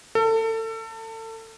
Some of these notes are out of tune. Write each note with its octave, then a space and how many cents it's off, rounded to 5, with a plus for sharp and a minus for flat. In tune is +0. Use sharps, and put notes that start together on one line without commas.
A4 +30